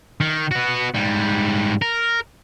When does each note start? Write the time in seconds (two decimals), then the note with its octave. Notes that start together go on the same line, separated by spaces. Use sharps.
0.21 D#3
0.51 B3 F#4
0.94 G#2 G3
1.82 A#4